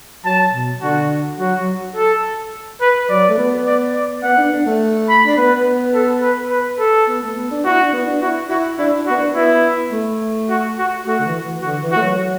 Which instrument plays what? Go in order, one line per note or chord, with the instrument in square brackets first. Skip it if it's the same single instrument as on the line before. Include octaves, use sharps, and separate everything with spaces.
[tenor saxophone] F#3 [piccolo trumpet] A5
[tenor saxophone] B2
[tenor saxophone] D3 [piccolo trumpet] F#4
[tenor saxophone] F#3 [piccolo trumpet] F#4
[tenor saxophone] F#3
[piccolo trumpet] A4
B4
[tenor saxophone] F#3 [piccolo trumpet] D5
[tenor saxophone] A3
B3
[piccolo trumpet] D5
D5
[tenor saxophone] B3 [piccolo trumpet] F#5
[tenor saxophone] D4
D4
A3
[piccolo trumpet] B5
[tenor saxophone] D4
[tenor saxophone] B3 [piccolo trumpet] B4
[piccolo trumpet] A4
B4
B4
A4
[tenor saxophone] B3
A3
B3
D4
[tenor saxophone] E4 [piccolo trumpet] F#4
[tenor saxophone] D4
B3
D4
[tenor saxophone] E4 [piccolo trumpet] F#4
[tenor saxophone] E4 [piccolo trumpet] F#4
[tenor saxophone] D4 [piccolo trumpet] E4
[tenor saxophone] D4
[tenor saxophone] B3 [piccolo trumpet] F#4
[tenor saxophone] D4
[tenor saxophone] B3 [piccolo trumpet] E4
[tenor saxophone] A3
[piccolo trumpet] F#4
F#4
[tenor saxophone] A3 [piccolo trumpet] F#4
[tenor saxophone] D3
E3
E3
[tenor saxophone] D3 [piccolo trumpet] F#4
[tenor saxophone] E3
[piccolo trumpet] F#4
[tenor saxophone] A3
F#3